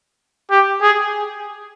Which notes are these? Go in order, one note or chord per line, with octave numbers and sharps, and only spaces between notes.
G4
G#4